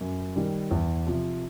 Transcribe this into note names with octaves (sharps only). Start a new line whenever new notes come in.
F#2
D#3 G3
E2
C3 F3